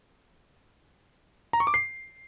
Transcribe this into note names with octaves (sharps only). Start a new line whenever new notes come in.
A#5
C#6
D6
C7